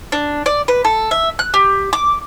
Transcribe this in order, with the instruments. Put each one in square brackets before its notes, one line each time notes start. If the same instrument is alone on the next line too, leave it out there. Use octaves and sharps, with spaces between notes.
[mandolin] D4
D5
B4
A4
E5
F#6
G4
D6